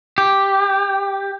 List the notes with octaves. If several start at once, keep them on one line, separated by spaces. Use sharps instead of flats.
G4